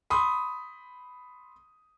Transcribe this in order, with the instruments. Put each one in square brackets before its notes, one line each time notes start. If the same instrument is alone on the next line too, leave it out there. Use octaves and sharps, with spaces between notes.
[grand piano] B5 C6 D#6